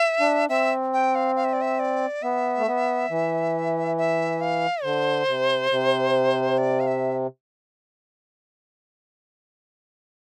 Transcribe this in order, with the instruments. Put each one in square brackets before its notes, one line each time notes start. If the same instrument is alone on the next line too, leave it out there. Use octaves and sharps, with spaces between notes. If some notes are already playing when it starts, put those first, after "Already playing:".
Already playing: [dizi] E5
[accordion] D4
[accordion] C4 [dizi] E5
[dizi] G5
F5
F5
E5
D5
E5
D5
[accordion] B3 [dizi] E5
[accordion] A3
B3
E3
[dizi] E5
F5
[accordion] D3 [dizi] C5
[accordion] C3
C3
[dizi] D5
F5
E5